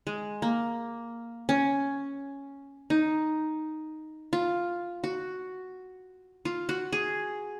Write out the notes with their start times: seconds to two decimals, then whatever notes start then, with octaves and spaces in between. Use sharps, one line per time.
0.07 G#3
0.42 A#3
1.49 C#4
2.90 D#4
4.33 F4
5.04 F#4
6.45 F4
6.69 F#4
6.92 G#4